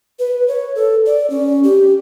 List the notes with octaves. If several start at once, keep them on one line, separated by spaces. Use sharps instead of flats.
B4
C#5
A4
D5
C#4
G4